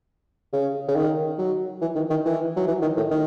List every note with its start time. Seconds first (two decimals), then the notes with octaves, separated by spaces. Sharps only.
0.53 C#3
0.88 C#3
0.96 D#3
1.39 F#3
1.81 E3
1.95 D#3
2.10 D#3
2.25 E3
2.56 F#3
2.67 E3
2.82 D#3
2.97 A2
3.11 D#3